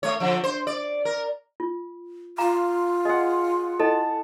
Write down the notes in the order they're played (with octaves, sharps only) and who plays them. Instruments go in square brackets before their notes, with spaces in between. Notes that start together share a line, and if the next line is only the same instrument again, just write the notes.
[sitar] A3 C#5
D3 F3
C5
D5
A#4
[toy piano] F4
[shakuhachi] F4 [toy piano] F5 A#5 D6
[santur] G#4 F#5 [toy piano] D#5
[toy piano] E4 A4 D#5 [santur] F#5 A5